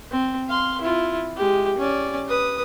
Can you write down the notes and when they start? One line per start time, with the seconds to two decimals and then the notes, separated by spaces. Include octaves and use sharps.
0.11 C4
0.49 F5 C6
0.81 E4 F4
1.36 G#3 G4
1.78 C#4 D5
2.27 B4 D#6